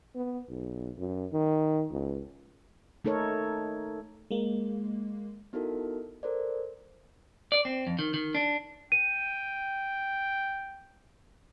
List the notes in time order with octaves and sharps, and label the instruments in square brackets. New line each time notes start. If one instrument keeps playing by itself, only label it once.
[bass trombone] B3
B1
F#2
D#3
C#2
[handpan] A3 D#4 A4 A#4 C#5
[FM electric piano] G#3 A#3
[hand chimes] B3 D#4 E4 F#4 A4 A#4
A4 A#4 C5 D5
[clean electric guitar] D5
C4
F2
D#3
D#3
D4
[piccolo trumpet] G5 [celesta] D#7